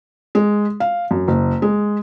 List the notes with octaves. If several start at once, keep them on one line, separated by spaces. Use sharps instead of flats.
G#3
F5
F#2
F#1
G#3